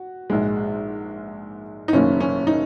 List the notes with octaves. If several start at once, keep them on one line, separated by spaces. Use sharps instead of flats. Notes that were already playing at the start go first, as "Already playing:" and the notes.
Already playing: F#4
A#1 G#2 G#3
D#4
F#1 F#2 D#3 A#3 C#4
C#4
D#4